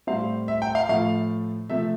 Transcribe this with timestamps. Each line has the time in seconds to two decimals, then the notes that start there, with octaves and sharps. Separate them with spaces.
0.07 A2 G3 C4 F5
0.48 E5
0.62 G5
0.75 F5
0.89 A2 F3 A3 F5
1.70 C3 F3 A3 E5